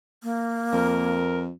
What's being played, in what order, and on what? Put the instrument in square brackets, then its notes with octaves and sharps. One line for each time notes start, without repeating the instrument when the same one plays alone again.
[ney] A#3
[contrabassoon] F2 [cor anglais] A#4